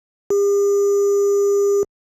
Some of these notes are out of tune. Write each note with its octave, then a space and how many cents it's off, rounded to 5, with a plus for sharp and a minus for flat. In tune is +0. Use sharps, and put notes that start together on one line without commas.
G4 +45